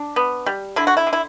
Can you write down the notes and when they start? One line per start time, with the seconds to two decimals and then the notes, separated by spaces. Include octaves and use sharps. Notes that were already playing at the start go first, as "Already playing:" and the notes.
Already playing: D4
0.16 B3
0.46 G3
0.76 D3 E4
0.87 F#4
0.97 E4
1.07 D3
1.13 E4